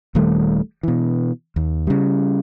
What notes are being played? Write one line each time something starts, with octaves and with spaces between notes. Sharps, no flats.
D#1 D#3 G3 A3
B2 E3
D#2
C#3 G3